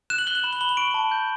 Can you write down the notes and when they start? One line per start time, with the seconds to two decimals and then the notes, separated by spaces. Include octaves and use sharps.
0.10 F#6 E7
0.19 F#7
0.27 F#6 G7
0.35 F#7
0.44 B5 E7
0.53 F#7
0.61 B5 G7
0.69 F#7
0.77 C#6 D7
0.94 A5
1.12 G6